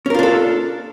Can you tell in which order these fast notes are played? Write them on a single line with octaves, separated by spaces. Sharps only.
C#4 A#4 F4 D4 A4